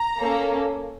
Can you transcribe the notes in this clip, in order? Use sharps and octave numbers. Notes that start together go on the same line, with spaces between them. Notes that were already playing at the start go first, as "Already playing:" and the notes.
Already playing: A#5
A#3 C#4 A4